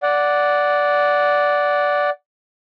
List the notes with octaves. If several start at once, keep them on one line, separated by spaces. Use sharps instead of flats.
D5 F#5